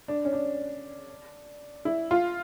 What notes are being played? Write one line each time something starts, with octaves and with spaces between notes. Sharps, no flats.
D4
C#4
D4
E4
F4